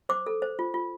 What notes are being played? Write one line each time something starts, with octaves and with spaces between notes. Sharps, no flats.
C5 D6
A4
C5
F4
F4